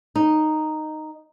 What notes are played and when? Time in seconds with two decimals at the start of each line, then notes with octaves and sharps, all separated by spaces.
0.16 D#4